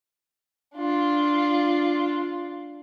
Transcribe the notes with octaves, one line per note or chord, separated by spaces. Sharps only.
D4 F4